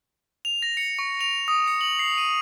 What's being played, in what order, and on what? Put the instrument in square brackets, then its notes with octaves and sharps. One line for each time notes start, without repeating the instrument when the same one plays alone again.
[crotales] F7
A#6
C#7
C#6
F7
D#6
C#7
F#7
C7
D#7